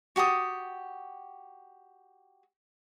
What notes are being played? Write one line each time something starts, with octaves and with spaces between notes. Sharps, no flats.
F#4 G4 A5 D#6